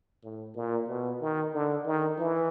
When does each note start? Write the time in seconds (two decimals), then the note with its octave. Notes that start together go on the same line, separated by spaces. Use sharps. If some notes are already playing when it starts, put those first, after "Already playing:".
0.23 A2
0.55 A#2
0.88 B2
1.21 D#3
1.54 D3
1.86 D#3
2.19 E3